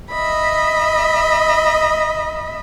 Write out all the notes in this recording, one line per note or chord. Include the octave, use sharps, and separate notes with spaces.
D#5 E5 B5